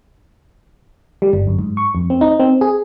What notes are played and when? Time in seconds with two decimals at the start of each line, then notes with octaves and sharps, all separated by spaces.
1.22 G3
1.33 G1
1.47 F#2
1.59 G#2
1.77 C#6
1.95 F2
2.10 C4
2.21 D#4
2.40 C4
2.61 G#4